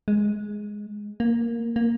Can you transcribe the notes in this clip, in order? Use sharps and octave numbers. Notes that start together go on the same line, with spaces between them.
G#3
A#3
A#3